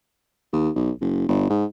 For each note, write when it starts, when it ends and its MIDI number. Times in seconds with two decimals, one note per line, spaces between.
0.53 0.70 39
0.76 0.91 35
1.01 1.24 30
1.28 1.47 31
1.50 1.65 44